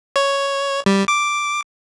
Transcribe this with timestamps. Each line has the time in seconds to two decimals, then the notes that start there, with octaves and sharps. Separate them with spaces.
0.16 C#5
0.86 G3
1.08 D6